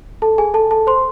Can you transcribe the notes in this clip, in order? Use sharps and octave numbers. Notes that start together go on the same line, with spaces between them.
A4 A5
G#4 G#5
A4 A5
A4 A5
C5 C6